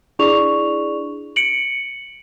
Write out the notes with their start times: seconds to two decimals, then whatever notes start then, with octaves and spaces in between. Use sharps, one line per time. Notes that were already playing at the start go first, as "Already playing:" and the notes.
0.19 D4 E4 G#4 D5 C#6 F7
1.36 C#7 D7 F#7